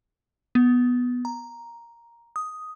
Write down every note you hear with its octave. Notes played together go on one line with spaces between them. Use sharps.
B3
A#5
D#6